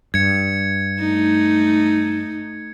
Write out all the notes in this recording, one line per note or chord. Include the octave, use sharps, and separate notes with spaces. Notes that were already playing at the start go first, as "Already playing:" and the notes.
G2 G#6 C#7
A3 D#4